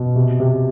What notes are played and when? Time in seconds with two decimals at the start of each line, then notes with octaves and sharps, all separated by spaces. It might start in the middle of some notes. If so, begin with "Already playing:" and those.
Already playing: B2
0.15 C3
0.40 C3